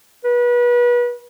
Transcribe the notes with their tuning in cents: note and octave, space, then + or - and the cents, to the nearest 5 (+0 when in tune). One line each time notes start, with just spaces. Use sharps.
B4 -30